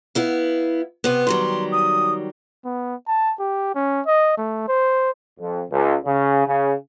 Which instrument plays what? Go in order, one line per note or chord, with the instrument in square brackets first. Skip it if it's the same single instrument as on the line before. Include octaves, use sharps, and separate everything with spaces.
[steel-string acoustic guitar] B3 E4 F5
C3 B3
[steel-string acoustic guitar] D#3 F#3 G3 [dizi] C6
[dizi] D#6
[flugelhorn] B3
A5
G4
C#4
D#5
A3
C5
[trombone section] F2
C#2
C#3
C#3